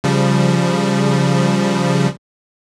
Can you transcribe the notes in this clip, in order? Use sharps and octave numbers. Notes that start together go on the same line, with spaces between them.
C#3 F3 G3